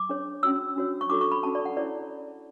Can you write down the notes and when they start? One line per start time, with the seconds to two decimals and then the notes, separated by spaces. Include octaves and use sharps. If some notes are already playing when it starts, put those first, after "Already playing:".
Already playing: D6
0.09 D4 G#4 C#5
0.43 C#4 F#4 C#5 E6
0.76 D4 F#4 C#5
1.01 C#6
1.10 D4 F#4 A4 C#5 D6
1.21 C#6
1.32 B5
1.43 C#4 F#4 A4 A5
1.55 D5
1.66 F#5
1.77 E4 G#4 C#5 D5